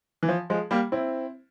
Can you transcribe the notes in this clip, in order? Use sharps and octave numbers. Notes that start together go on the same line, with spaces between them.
E3
F3
F3 G#3
G3 A#3
C4 E4